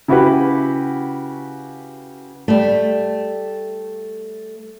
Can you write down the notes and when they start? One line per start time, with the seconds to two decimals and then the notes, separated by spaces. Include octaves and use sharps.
0.08 C#3 E4 F#4 G4 B4
2.48 G3 A3